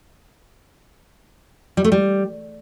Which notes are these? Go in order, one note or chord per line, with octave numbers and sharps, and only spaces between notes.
G3
A3
G3